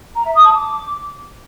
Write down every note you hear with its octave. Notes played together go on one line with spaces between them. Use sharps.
A#5
E5
D#6
A5
D6